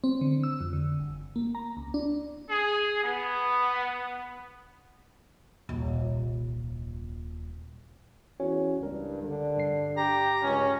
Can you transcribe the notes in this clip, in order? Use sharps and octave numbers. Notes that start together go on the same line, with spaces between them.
C4
D3
E6
F2
D3
G1
A#3
A#5
C#2
D4
G#4
B3
D#1 C2
E2 C#4 F#4 C#5
C#2 G2 A#4
D3
G2 C7
G4 A#5
C#2 C#4